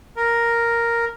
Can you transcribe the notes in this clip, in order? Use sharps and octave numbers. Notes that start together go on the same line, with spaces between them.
A#4